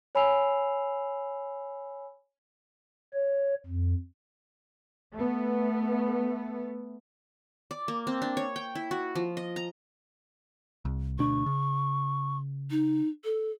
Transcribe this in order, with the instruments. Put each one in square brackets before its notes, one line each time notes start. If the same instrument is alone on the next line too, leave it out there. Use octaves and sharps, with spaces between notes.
[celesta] C#5 G#5 B5 E6 C7 F7
[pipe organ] C#5
F2
[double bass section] A3 B3
[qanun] D5
A#3
C4
D4
C#5
G5
E4
F#4
F3
D#5
A#5
[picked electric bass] C2
[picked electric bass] D2 B2 D4 [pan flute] C#6
[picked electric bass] C#3
[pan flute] D#4
A4